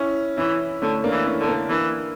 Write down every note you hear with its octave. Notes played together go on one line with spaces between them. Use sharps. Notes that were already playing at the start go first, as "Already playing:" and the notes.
Already playing: C#4 E4
E3 C#4 E4
D3 A3 C#4
A#3 D4
E3
C#4 E4
D3
A#3 D4
E3 A#3 D4